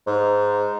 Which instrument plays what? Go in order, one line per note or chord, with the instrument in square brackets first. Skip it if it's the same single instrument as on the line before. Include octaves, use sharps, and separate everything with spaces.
[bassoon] G#2